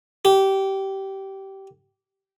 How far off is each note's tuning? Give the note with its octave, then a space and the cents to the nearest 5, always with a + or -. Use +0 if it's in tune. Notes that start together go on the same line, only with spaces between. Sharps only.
G4 -20